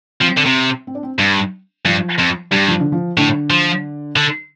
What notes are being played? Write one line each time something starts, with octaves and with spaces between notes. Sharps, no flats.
F3 C4
D3
C3
C4
D4
C4
G2
G2 F3
F2
G2 G3
F3
D3
F3
A2 D3
F3
D3